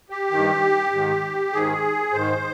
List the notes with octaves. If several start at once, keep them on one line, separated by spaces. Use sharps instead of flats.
G4
G2 D#3
G#2 D#3
G#2 D#3 G#4
G#2 D#3 C5